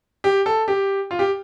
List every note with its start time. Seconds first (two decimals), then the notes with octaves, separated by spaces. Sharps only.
0.24 G4
0.46 A4
0.68 G4
1.11 F4
1.19 G4